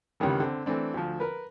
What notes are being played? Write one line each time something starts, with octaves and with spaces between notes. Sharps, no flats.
C#2 G2 C3 D#3 E3
D3 C4
E3 A3 C4 D4
D2 F3
A#4 B4